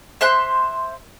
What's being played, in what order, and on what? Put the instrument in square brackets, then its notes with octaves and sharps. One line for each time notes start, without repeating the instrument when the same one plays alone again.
[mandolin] C5 E5 C6 F#6